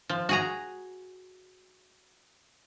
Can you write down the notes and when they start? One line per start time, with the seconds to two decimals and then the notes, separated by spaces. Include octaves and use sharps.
0.10 F3
0.29 F#4 G#4 A#5